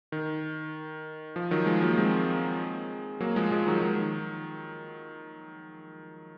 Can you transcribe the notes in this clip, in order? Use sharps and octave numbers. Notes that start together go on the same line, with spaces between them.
D#3
F3
D#3 F#3
F3 G#3
F#3 A#3
G#3 C4
F#3 A#3
F3 G#3
F3 G#3
D#3 F#3
D#3